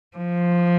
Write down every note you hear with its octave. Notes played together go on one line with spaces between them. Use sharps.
F3